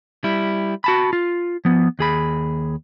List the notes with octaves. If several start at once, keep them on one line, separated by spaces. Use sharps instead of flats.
G3 E4
F#4 A5 B5
F4
F3 B3
D#2 G#4 B5